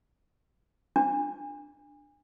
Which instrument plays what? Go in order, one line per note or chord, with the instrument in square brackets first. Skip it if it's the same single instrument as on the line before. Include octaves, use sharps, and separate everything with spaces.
[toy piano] D4